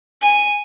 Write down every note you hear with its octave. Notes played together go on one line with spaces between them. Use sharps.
G#5